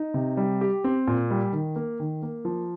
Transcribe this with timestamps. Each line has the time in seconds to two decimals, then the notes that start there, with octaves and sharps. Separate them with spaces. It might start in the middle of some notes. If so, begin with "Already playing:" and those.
Already playing: D#4
0.14 C3
0.37 G3
0.61 G4
0.84 C4
1.07 A#2
1.31 G3
1.53 D#3
1.76 A#3
2.00 D#3
2.22 A#3
2.45 F3